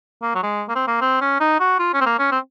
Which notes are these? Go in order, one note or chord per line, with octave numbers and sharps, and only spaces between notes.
A#3
F#3
G#3
A#3
C4
A#3
C4
C#4
D#4
F#4
F4
C#4
C4
A#3
C#4
C4